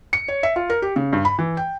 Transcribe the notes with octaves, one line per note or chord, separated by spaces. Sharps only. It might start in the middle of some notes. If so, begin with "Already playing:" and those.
C#7
C#5
E5
F4
A#4
G4
C#3
G2
B5
E3
G5